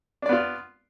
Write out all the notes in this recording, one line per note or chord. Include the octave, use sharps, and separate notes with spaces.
B3 D4 F4 D5